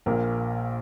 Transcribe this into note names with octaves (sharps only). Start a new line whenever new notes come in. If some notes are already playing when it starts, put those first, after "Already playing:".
A#1 A#2 A#4